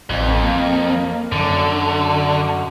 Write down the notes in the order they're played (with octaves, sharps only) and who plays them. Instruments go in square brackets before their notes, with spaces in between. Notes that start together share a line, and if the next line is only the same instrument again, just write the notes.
[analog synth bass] A1 [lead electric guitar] F2
[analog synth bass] A#3
[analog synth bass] F#2 [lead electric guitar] D3